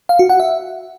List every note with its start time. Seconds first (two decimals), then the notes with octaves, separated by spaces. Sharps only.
0.09 F5
0.19 F#4
0.29 F#5
0.40 E5